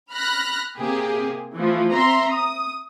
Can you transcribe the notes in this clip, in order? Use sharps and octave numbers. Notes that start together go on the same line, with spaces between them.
B5 F6 F#6 A#6
C3 A#3 G4 G#4
E3 F3 A3
C4 E5 A#5 C6
D#6